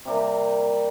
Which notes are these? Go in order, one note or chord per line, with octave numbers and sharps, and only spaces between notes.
C3 G3 A#3